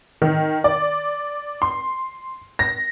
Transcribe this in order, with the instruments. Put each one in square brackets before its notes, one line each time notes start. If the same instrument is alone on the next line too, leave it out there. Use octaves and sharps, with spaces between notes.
[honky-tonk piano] D#3
D5
C6
A#6